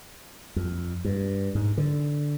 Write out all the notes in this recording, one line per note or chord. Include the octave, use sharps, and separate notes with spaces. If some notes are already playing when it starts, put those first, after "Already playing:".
F2
G2
G#2
D3